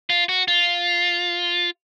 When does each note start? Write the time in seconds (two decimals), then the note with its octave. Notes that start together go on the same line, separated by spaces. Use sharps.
0.10 F4
0.29 F#4
0.48 F4